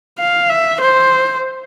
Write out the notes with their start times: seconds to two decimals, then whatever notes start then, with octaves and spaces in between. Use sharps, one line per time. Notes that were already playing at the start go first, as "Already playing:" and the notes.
0.19 F5
0.49 E5
0.81 C5